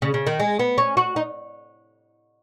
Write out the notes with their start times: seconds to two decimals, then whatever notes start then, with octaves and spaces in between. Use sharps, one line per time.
0.02 C#3
0.14 C#3
0.27 D#3
0.40 G#3
0.59 B3
0.78 C#4
0.97 F#4
1.16 D#4